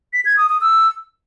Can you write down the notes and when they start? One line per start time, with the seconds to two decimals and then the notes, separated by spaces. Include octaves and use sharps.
0.13 B6
0.25 G#6
0.37 D#6
0.49 D#6
0.61 E6